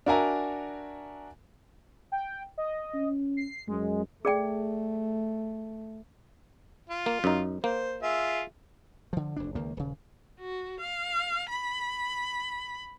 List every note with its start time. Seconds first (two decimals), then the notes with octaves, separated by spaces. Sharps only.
0.06 D4 F#4 A#4 E5 G#5 A#5
2.12 G5
2.58 D#5
2.94 C#4
3.37 C7
3.68 F#2 G#3
4.25 A3 G#4 D5 G5
6.90 F4
7.06 A#3
7.24 F#2 D#4
7.64 A#3 C5
8.02 F4 G#4 E5
9.13 D3 F3
9.36 F1 D2 D4
9.55 C#2 D#3 A#3
9.77 D#1 C#3
10.40 F#4
10.80 F5
11.49 B5